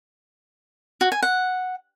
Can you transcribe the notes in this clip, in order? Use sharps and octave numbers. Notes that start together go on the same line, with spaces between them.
F#4
G#5
F#5